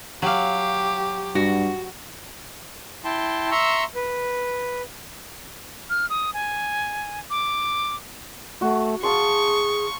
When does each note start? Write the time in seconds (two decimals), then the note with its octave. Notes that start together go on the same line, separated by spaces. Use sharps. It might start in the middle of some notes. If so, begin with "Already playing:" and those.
0.22 F#3 G4 F5
1.35 G2 F#4
3.04 E4 G5 A5 C6
3.51 E5 A#5 C6 C#6 E6
3.96 B4
5.90 F6
6.10 D#6
6.34 G#5
7.30 D6
8.61 A3 F#4
9.03 G#4 F5 A5 C6 C#6